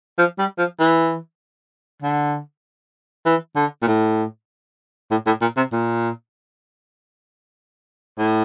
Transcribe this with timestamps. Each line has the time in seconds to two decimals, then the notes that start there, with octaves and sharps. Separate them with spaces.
0.18 F3
0.39 G3
0.58 F3
0.80 E3
2.02 D3
3.26 E3
3.56 D3
3.82 A#2
3.87 A2
5.11 A2
5.26 A2
5.41 A#2
5.57 C3
5.72 A#2
8.19 A2